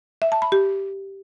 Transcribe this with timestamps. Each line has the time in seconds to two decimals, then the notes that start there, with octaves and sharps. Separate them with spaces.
0.22 E5
0.32 A5
0.42 B5
0.52 G4